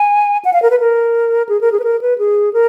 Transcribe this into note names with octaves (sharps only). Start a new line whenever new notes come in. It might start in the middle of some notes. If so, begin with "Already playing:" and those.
Already playing: G#5
F#5
F5
A#4
B4
A#4
G#4
A#4
G#4
B4
A#4
B4
G#4
A#4